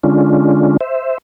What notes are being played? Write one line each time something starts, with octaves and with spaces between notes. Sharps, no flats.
D3 G#3 C#4 D4 F4
C5 E5